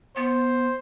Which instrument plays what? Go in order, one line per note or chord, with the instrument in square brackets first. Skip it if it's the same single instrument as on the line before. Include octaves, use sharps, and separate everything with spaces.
[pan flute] B3 [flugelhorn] C5